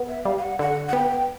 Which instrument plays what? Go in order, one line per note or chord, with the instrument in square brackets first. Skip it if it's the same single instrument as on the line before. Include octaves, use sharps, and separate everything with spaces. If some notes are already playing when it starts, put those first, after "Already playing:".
Already playing: [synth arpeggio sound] B3
[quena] E5
[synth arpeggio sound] G3 [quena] F5
[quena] F5
F#5
[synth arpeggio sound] D3 [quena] F#5
[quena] F#5
[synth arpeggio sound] B3 [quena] G5